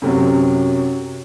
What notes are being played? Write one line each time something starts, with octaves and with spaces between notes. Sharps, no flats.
F#2 C3 F#3